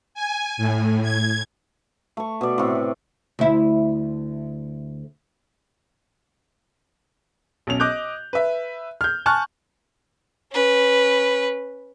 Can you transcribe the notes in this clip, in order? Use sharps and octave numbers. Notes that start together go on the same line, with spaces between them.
G#5
A2
G#6
A3 C#6
B2 D5
A2 C3
D2 E4
B1 C#4 F7
D#5 D6 F#6 G6
B4 E5
F6 G6
G#5 A5 C#6 F6 F#6
C#4 B4